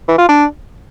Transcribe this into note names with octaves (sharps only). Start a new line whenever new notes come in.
E3
F4
D4